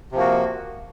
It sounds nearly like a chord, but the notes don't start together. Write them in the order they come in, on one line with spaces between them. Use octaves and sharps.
C3 F3 A#3 F#4